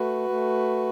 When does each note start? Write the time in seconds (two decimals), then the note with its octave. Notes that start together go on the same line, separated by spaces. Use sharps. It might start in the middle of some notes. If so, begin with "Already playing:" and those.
Already playing: A3 F#4 B4
0.29 A3